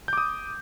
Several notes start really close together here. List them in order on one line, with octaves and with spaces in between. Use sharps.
G6 D6 D#6